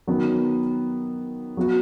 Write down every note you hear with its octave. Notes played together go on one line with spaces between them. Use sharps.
D#3 F#3 B3
F#3 B3 F#4